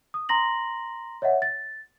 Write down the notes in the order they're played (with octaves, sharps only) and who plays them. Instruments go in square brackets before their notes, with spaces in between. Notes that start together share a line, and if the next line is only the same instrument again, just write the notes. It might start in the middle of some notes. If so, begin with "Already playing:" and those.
[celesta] D#6
A#5 C6 A#6 F#7
C#5 D#5 E5 F#5
A6